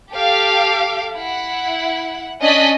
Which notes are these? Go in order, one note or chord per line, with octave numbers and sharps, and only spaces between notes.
G4 A4 F5 D6
E4 F#5
C#4 D4 D#5 F#6 B6